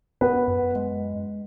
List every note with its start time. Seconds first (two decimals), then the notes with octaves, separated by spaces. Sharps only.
0.21 B3 B4
0.48 F#2
0.75 G#3